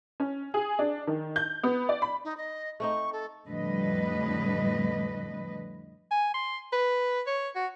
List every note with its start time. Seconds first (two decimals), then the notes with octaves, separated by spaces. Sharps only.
0.20 C#4
0.54 G#4
0.79 D4
1.07 D#3
1.36 G6
1.63 B3
1.89 D5
2.02 B5
2.25 D#4
2.37 D#5
2.80 A3 C4 D#4 C#6
3.13 A4
3.47 F2 A2 D3 G3 B4 D#5
6.11 G#5
6.34 C6
6.73 B4
7.27 C#5
7.56 F#4